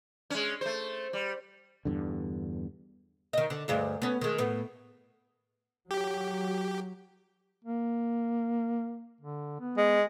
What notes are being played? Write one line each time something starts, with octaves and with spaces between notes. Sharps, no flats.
G#3 C#4
A3 C5
G3
E2 G2 D3
D#3 D#5
D3
D2 G2 G#3
B3 C#4
D#3 G#3
A2 B3
F#3 G4
A#3
D3
B3
G#3